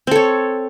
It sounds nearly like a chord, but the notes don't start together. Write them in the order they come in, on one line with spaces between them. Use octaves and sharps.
C4 A4 C#5